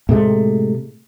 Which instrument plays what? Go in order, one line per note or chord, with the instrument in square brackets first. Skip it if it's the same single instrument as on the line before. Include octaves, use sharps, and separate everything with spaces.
[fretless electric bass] A2 C3 G#3 A3